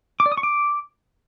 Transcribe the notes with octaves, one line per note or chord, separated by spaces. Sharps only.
D6
D5
D#6
C#6
D6